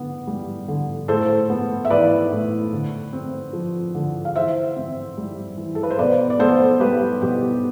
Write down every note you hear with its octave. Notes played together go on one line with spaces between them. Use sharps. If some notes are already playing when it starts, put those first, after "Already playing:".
Already playing: D3 B3
G3
D3
A2 A4 C5
B3
E5
E3 B4 D5
A2
D3
C4
F3
D3
F5
E3 C5 E5
C4
G3
E3
A4
B4
C5
B2 B4 D5
D5
B3 A4 C5
G3 G4 B4
B2 G4